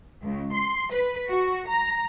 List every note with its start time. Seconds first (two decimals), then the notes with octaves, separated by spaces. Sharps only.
0.22 C#2
0.52 C6
0.91 B4
1.28 F#4
1.68 A#5